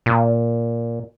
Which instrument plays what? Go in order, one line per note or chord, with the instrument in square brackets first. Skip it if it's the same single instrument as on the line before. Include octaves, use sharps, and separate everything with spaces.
[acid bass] A#2